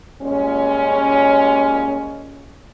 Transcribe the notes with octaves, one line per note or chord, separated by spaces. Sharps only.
A#2 G3 G#3 C#4